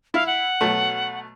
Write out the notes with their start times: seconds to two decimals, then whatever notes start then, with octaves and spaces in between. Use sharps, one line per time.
0.14 E4 F5
0.26 F#5
0.61 B2 F#3 A3